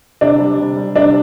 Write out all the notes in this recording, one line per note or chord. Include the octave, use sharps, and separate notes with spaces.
C3 D4
G3
C3
G3
C3 D4